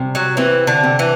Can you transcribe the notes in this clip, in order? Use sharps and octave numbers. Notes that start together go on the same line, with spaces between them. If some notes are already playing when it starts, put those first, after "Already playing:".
Already playing: C3 G3
F#3
E3 C4
D3
C3
E3